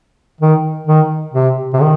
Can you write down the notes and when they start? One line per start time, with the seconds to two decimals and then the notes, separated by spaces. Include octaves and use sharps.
0.41 D#3
0.87 D#3
1.34 C3
1.74 C3
1.81 D#3